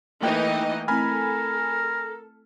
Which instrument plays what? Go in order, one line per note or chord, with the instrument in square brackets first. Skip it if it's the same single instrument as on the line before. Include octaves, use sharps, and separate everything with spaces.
[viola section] E3 D#4 D#5 [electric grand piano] A3 A#3 G5
[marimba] A3 C4 E4 [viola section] A4 [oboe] A#4 [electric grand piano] G#5 B5 F6